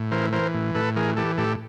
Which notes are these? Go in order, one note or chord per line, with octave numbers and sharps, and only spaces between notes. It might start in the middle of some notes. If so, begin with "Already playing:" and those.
Already playing: A2
E3 A#4 C5
E3 A#4 C5
A2
A2 A4 B4
E3 G#4 A#4
E3 G4 A4
A2 G4 A4